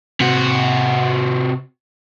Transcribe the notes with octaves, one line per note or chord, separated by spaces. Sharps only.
C3 F#4